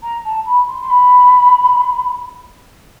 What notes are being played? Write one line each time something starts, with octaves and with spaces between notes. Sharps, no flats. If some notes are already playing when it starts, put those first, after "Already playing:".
A#5
A5
B5
C6
C6
B5